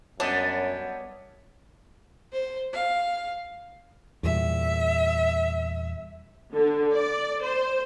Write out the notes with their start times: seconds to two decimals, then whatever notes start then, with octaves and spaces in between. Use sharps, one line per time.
0.20 F#2 G3 B3 D4 C#5 D#5
2.32 C5
2.73 F5
4.23 E2 A#2 G3 E5
6.53 D3
6.94 D5
7.43 C5